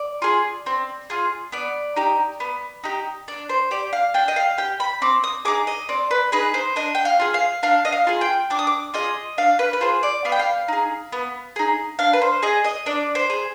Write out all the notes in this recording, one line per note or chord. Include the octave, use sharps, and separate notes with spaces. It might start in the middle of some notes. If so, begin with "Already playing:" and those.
Already playing: D5
F4 G#4
C4
F4 G#4
B3 D5
D#4 G4
B3
D#4 G4
D4 D5
C5
G4 D5
F5
D4 G5
D#5
F5
G4 G5
B5
C4 D6
D#6
D#4 G#4 D6
D#5
C4 D5
B4
D#4 G#4 B4
C5
D4 D#5
G5
F5
F4 G#4
F5
D4 F5
D#5
F5
F4 G#4
G5
D4 D6
D#6
D6
F4 G#4 D#5
D4 F5
B4
B4
F4 G#4 C5
D5
B3 F5
G5
F5
D#4 G#4
B3
D#4 G#4
D4 F5
B4
C5
G#4 D#5
D#5
D4 D5
C5
G#4